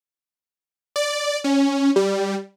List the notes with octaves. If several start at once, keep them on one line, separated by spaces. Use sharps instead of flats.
D5
C#4
G3